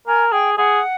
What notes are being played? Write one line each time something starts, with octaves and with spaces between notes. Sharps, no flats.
A#4 G#5
G#4 G5
G#4 F#5